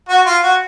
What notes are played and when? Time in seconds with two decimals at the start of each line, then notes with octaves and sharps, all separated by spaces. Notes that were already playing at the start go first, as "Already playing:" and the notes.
0.09 F#4
0.26 F4
0.43 F#4